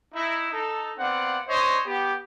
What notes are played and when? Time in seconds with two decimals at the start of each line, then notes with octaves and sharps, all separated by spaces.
0.14 D#4 E4
0.51 D#4 A4
0.99 B3 C4 D5 F5 F#5
1.47 D4 C5 C#5 D#5
1.85 B3 G4